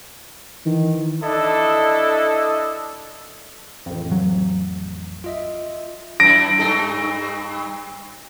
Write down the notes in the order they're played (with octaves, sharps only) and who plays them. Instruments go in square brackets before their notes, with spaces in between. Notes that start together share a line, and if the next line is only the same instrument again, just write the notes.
[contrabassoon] D#3 [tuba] E3
[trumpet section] D4 E4 A4 D#5
[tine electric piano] A1 F2
[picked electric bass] F#3
[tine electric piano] F4 D#5 E5
[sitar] F#2 E4 [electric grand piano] A#6 D7
[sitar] G2 D#4 A4